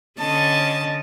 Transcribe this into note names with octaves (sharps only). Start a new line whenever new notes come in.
D3 C#4 D#5 A5